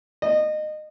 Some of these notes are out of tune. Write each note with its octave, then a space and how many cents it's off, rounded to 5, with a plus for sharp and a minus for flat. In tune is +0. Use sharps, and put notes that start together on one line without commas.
D#5 -25